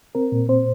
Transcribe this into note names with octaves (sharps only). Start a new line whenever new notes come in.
C4 A#4
A#2
C4 C5